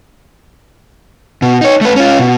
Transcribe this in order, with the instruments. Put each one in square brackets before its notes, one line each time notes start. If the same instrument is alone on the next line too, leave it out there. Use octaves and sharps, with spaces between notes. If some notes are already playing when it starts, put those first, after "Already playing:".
[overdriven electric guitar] B2
D#4 C#5
A3 B4
C#4 F4
B2